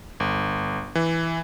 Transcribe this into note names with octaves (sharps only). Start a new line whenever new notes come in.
G1
E3